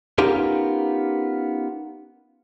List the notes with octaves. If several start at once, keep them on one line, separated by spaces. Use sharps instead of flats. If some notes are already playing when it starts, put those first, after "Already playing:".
B3 C#4 D#4 F4 G4 A#4